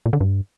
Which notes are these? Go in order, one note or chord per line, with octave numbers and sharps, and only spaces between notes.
A#2
D3
G2